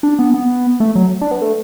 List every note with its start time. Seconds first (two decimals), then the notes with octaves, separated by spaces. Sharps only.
0.03 D4
0.19 B3
0.34 B3
0.80 A3
0.96 F#3
1.21 D4
1.31 B3
1.42 A3